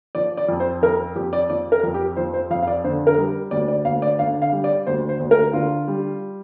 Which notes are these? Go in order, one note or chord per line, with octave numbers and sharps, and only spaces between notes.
F3 D5
D5
F2
C5
F3 A#4
F2 G4
D5
F3 D5
A#4
F2
G4
F3 C5
C5
F2 F5
F5
D5
D3 C5
A#4
G3
D2 D5
D5
D2 F5
D5
D3 F5
F5
G3
D5
D2 C5
C5
D2
A#4
D3 F4
G3